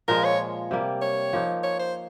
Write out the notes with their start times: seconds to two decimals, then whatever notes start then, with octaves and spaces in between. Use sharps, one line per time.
0.08 A#2 F3 G#3 A#4
0.24 C#5
0.71 C3 G3 A#3
1.02 C#5
1.33 F3 A#3 D#4
1.64 C#5
1.79 C5